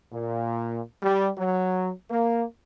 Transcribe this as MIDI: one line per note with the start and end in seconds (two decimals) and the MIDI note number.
0.13 0.81 46
1.03 1.29 55
1.38 1.91 54
2.10 2.43 58